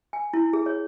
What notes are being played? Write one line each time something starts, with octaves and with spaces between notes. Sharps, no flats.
G#5
E4
G#4
C#5